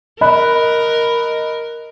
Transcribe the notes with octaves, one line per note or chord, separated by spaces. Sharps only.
A#4 D#5 B5 F#6